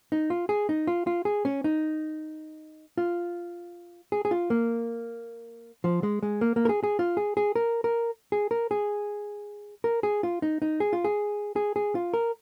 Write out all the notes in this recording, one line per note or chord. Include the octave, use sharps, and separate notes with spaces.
D#4
F4
G#4
D#4
F4
F4
G#4
C#4
D#4
F4
G#4
G#4
F4
A#3
F3
G#3
G#3
A#3
A#3
A#4
G#4
G#4
F4
G#4
G#4
A#4
A#4
G#4
A#4
G#4
A#4
G#4
F4
D#4
D#4
G#4
F4
G#4
G#4
G#4
F4
A#4